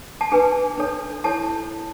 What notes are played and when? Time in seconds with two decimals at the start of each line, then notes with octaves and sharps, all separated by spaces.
0.21 A5
0.32 D4 G#4 B4 G#5
0.78 D4 A4 C#5
1.24 E4 A4 C#5 A5